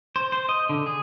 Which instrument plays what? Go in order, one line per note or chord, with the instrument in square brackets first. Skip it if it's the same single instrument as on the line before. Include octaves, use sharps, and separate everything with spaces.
[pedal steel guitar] C5
C5
D#5
D3
G#4